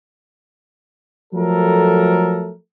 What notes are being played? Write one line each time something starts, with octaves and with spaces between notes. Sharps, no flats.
F3 F#3 A3 A4 A#4